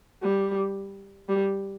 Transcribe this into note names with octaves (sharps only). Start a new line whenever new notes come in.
G3
G3